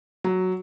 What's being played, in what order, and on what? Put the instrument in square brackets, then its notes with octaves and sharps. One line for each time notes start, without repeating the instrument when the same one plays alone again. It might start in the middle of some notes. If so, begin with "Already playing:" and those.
[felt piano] F#3